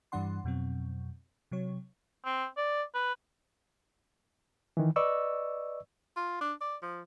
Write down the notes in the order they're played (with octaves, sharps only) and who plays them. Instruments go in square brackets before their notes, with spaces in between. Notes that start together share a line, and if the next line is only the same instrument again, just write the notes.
[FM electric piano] G2 E3 G3 D4 F#5 C6
F2 B2 F#3 C4
C3 F#3 C#5
[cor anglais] C4
D5
B4
[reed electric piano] D#3 E3
B4 D5 D#5 C#6 E6
[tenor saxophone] F4
D4
D5
F3